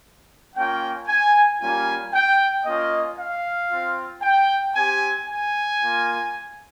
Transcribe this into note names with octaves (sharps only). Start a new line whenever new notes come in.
A#3 C#4 F4 G5
G#5
G3 A#3 C#4 F4 G#5
G5
A#3 C#4 F4 D#5
F5
C4 F4
G5
C4 G4 G#5
G#5
A#3 F4